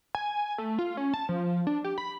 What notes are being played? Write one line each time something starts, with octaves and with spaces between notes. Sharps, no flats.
G#5
A3
F4
C#4
A5
F3
D4
G4
B5